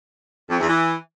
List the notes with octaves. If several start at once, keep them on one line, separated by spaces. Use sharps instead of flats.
F2
E2
E3